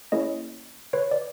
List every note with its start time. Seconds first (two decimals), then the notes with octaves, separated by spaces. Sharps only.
0.12 A#3 C#4 E4 G#4 C#5 D#5
0.93 B4 C#5
1.11 D5